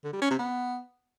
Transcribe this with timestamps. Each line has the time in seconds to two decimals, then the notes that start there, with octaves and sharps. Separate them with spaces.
0.04 D3
0.13 G3
0.22 C#4
0.30 C3
0.39 B3